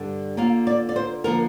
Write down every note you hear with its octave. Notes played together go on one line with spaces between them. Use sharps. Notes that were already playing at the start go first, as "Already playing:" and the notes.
Already playing: G2 D3 G3
D3 A#3 F4 F5
D5
D5
C5
D3 F3 A#3 A#4